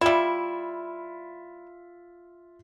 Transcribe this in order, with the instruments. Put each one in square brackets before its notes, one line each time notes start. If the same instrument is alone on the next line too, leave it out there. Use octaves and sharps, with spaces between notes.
[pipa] G3 E4 [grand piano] F4 E5